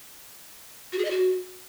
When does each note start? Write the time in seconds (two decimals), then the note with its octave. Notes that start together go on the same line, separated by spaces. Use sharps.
0.93 F#4
0.99 G#4
1.05 D#5
1.11 F#4